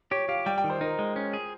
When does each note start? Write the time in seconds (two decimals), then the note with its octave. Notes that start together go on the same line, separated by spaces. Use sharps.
0.11 G4 C#5
0.29 G4 F5
0.46 G3 G5
0.58 G5
0.64 D#3
0.70 C5
0.81 D#4 A#4
0.99 G#3
1.16 C#4
1.33 G#4